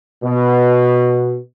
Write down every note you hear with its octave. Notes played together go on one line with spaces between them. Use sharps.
B2